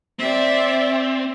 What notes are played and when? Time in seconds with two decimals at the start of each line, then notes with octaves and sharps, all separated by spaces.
0.19 C4 D5 E5